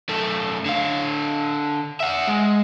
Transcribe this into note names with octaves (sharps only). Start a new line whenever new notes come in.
F#2 A3
D3 F5
E5 F#5
G#3